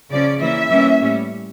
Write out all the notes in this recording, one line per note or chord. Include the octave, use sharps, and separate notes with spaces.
C#3 F3 C#4 D5
E3 A#3 C#4 E5
E3 G3 A#3 C#4
A2 G3 C#4